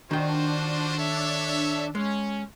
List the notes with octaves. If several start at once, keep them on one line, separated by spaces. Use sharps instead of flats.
D#3 D4 F4 F#4 C5 G5
A4 C#5 E5
G#3 C#4